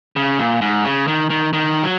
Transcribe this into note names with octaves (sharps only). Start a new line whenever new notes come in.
C#3
A#2
G#2
C#3
D#3
D#3
D#3
F#3